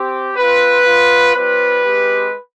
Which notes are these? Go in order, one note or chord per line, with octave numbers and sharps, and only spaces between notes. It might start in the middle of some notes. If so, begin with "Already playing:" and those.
Already playing: C4 G4
C4 F4 B4
B3 F4
G3 C4 F4 B4
G#3 C4 G4